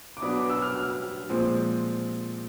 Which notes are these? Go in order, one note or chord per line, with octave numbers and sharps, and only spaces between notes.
D6
B2 F#3 B3 D4 D#6
D6
E6
F6
F6
A#2 F3 G#3 C4